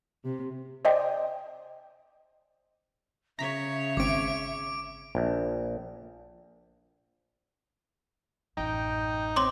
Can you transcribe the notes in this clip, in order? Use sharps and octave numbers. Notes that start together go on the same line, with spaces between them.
C3
C5 D5 D#5 G5
C#3 C#5 E5 A#5 B6
G#1 C4 D6 D7
A#1
A1 F#2 D#4 G5
C4 C#5 C6 D6